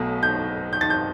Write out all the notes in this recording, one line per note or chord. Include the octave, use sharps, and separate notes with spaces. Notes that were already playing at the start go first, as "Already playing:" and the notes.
Already playing: B1 B2 F#3 A3
G6
G6
A6
G6